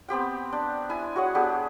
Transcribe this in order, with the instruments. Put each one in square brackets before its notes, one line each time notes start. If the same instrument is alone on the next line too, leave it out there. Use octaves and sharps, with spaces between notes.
[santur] B3 C4 G4 G5
D4
E4 G#5
F#4 G#4 C#5 F#5
B3 D4 G4 G#4